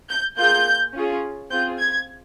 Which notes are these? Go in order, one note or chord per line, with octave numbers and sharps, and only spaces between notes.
G6
A#3 F4 G#4 G6
C#4 F4 G#4
C4 F4 G#4 G6
G#6